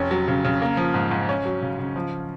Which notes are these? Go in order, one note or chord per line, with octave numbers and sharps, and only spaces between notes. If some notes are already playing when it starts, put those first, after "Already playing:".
Already playing: F1 C#4
F#3
C#3
C#3
A#3
F3
G#2
G#2
C#4
F#3
C#3
C#3
F3